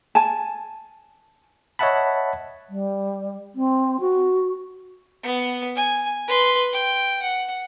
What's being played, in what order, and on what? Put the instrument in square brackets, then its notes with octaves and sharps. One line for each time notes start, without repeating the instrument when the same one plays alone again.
[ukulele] G#5 A5
[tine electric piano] C#5 D#5 E5 F#5 A5 B5
[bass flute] G3
C4
F#4
[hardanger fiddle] B3
G#5
B4 C6
G5
F#5